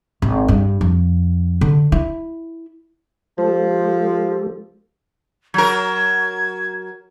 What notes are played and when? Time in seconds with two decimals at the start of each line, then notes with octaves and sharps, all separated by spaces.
0.22 G#1
0.48 G2
0.81 F2
1.61 D3
1.92 E4
3.38 F3 G#3 G4 A4
5.54 F#3 A#4 G#6